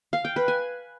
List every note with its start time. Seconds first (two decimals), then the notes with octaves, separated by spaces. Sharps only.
0.13 F5
0.25 G5
0.36 B4
0.48 G#5